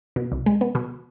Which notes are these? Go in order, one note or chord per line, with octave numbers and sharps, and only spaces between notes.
B2
C2
G#3
B3
B2